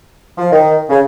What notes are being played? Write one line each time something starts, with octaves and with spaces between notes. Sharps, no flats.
F3
D#3
C#3